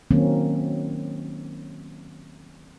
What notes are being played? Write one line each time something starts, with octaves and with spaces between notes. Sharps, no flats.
D#3 F#3 A#3 C4 C#4